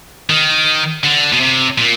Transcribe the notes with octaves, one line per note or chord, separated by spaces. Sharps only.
D#3
D3
B2
C3
A#2